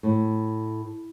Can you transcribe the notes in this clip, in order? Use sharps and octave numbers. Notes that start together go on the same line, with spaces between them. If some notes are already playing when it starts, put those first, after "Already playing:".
A2